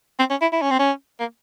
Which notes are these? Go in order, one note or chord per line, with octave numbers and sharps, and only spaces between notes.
C4
C#4
E4
E4
C#4
C4
C#4
A#3